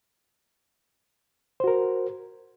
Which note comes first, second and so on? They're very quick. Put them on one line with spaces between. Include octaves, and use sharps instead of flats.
C5 F#4 A#4